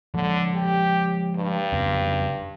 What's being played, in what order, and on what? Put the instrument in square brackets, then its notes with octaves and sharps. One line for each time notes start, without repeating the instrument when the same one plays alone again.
[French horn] D3 [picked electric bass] F3 G#3 A#3
[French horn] G4
G2
[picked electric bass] F2 C#3 B3